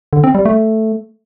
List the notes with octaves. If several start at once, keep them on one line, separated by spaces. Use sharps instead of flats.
D3
C4
G3
A3